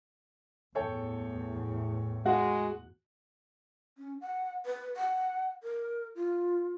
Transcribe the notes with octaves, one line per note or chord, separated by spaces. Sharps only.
E2 A2 A4 C#5 G5
G#3 F#4 F#5
C#4
F#5
B4
F#5
A#4
F4